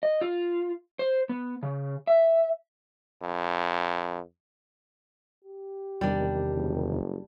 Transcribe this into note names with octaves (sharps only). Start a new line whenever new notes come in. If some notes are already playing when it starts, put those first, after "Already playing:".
D#5
F4
C5
B3
C#3
E5
F2
G4
E2 C3 D#3 G3 D4
F#1